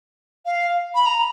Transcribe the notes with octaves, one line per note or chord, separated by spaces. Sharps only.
F5
B5
A#5